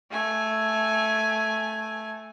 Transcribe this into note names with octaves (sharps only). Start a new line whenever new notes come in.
A3 G#5